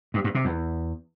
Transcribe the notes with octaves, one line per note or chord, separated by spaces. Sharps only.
G2
G2
C3
E2